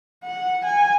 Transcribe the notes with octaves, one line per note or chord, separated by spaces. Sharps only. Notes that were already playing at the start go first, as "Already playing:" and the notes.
F#5
G#5